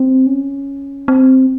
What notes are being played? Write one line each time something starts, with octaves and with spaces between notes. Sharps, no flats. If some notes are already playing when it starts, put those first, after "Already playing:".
Already playing: C4
C#4
C4